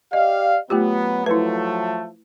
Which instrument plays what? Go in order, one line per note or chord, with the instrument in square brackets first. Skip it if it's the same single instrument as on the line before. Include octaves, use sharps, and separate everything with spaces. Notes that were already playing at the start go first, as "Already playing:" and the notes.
[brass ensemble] G4 D5 F5 [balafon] D#5
[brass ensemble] F#3 B3 [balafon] A3 F4 G4
[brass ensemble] F3 F#3 A3 [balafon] E4 B4